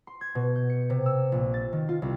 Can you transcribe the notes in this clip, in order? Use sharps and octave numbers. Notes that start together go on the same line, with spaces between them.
C6
G#6
B2
G6
C#7
C3
E6
A#1
A6
D#3
F4
C2